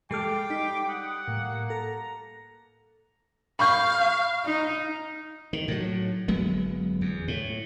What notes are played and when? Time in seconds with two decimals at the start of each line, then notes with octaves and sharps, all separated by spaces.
0.11 G3 G#3 A4 G5 D6 F6 C7
0.50 D#4 B6
0.89 F#5 D#6
1.28 A2 A#3
1.70 A4 A#5
3.59 F5 B5 C#6 G6
4.45 D#4
5.53 D#3
5.68 A2 F#3
6.28 G1 F#3 G#3 B3
7.01 E2
7.28 A2